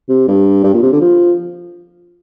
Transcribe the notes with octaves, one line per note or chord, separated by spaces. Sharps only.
C3
G2
G2
A#2
C3
D3
F3